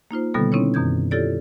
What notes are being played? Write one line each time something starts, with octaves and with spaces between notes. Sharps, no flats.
A#3 D#4 F4 C5
B2 D3 D#3 G3 B3 A4
C4 C#4 D#4 E4 C#5
F#2 B2 D#3 G6 G#6
E4 F4 G4 A4 C#5 D5